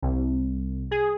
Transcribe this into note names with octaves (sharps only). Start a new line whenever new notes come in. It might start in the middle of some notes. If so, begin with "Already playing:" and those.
C2
G#4